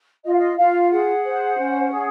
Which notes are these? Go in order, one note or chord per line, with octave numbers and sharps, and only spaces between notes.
F4 D#5
F5
D#5
F4 F5
G#4 F#5
C5
C#4
G#4